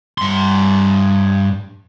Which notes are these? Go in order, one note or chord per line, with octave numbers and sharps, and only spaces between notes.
G2 C6